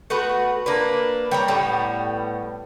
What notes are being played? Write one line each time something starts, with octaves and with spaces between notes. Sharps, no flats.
A3 B3 F#4 B4
A#3 D4 B4
G3 C#5 A#5
A2 G3 B3